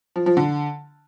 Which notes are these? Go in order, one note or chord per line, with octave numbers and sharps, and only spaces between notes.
F3
F3
D3